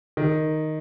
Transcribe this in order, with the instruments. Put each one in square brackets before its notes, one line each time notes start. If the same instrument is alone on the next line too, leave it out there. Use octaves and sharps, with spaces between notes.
[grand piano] D#3